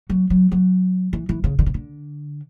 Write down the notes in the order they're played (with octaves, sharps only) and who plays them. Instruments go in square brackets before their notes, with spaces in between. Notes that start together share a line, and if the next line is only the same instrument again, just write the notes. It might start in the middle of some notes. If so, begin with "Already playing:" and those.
[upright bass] F#3
F#3
F#3
E3
E3
C#3
D3
C#3
D3